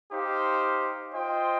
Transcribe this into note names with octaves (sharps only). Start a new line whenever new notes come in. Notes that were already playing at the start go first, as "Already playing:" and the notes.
D#4 G4 C5 F5
F4 C5 D#5 G5